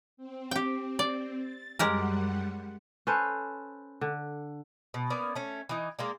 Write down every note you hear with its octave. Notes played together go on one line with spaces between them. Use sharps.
C4
G4 G5
D5
A6
F#2 G3 G#3 G4 A#4 F#5
C#4 A4 B4 C5
D3
B2
A#3 B3 C#4 D5
A3 C#4
E3 D#4
G#3 A#3 D5